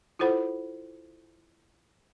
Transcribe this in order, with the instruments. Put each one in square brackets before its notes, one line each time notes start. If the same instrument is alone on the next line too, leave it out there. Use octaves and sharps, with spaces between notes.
[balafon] E4 F4 A4 C5 F#5 B5